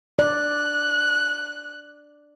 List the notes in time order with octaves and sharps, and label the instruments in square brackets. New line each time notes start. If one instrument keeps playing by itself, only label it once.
[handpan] D5 [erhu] F#6